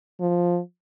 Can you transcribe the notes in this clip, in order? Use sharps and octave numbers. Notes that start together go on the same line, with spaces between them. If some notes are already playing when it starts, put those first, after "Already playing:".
F3